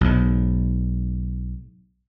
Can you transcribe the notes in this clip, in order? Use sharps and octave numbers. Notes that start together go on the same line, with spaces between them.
B1 G#2